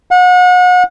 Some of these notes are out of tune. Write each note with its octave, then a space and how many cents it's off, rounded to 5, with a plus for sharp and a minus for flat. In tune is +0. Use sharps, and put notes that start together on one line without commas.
F#5 -35